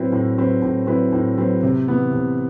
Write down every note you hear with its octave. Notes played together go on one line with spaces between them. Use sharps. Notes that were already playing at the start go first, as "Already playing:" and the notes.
Already playing: A2 F#3 C4 E4 B4
A2
F#3 C4 E4 B4
A2
F#3 C4 E4 B4
A2
F#3 C4 E4 B4
C3
E3 B3
C3